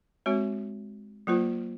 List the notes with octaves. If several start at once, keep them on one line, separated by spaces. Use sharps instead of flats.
G#3 C4 F#4 C#5
F#3 A#3 F4 C5